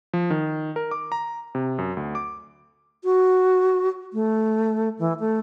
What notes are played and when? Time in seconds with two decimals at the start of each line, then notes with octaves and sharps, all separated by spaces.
0.13 F3
0.30 D#3
0.76 A#4
0.91 D6
1.12 A#5
1.55 C3
1.78 F#2
1.97 D2
2.15 D6
3.04 F#4
4.13 A3
4.99 E3
5.20 A3